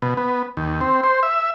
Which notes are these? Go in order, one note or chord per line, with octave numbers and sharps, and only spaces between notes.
B2
B3
D#2
C4
C5
E5